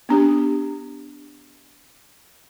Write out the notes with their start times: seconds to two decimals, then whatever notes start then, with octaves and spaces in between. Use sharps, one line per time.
0.09 B3 D4 G4